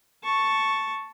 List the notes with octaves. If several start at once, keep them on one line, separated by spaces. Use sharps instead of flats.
A5 C#6